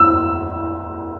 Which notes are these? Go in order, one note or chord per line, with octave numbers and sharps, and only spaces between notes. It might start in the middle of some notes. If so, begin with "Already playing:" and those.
Already playing: E6